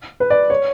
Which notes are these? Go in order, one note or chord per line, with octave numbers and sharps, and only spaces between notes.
B4
D5
C#5